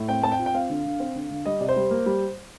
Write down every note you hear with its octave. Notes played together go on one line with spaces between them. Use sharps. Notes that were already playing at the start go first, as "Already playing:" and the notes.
Already playing: A2
C4 G5
C4 A5
G5
F4
G5
C4 F5
D3
D3
C4
D3
D3
G3 D#5
C3 D5
C5
G3
A#3
G3